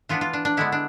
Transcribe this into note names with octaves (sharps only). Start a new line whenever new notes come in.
E3 B3 D4 F4
F4
D4
D4
D3 G#3 B3 E4
D4